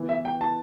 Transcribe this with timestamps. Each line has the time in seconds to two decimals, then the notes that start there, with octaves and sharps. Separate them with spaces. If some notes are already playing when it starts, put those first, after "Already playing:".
Already playing: E3 B3 E4
0.09 E5
0.25 G5
0.41 A5